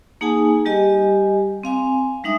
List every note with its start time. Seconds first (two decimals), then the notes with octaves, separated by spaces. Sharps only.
0.21 A#3 D#4 G#4 F#5 G#5 A5
0.65 G3 G4 D#5 G#5
1.63 C4 F5 G#5
2.24 G3 G#3 D4 D#4 E5 D#6